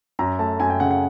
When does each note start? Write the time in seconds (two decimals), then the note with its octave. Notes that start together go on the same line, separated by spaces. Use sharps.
0.19 F#2 A#5
0.39 A3 A5
0.60 F#2 G#5
0.70 G5
0.80 C#3 F#5
0.91 F#5